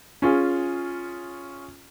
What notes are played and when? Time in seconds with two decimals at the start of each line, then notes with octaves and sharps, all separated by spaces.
0.22 C#4 F4 G#4